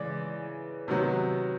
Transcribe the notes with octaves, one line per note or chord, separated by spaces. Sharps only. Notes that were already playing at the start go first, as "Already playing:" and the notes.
Already playing: C#3 E3 G#3 D5
C3 D#3 F#3 B3